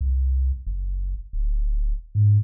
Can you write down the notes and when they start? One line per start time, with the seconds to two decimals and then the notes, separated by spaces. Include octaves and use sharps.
0.01 C2
0.67 F#1
1.33 D1
2.15 G#2